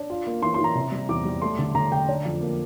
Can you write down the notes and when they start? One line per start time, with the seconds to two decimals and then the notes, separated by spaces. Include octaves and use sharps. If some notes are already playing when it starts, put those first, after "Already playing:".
Already playing: D4
0.10 F4
0.27 A#3
0.42 E3 C6
0.54 E3 C6
0.64 A#5
0.75 C3
0.92 G3
1.09 E2 D6
1.25 G3
1.42 A3 C6
1.59 D3
1.75 D3 A#5
1.91 D3 G5
2.09 D4
2.25 F2
2.41 A#3